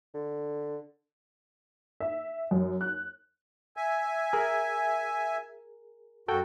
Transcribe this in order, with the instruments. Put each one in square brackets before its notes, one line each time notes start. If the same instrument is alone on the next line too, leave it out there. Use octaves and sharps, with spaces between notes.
[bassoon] D3
[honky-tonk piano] E5
F#2
F#6
[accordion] E5 G#5
[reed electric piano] G#4 A#4
[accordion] F#2 F#4 [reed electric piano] A4 G5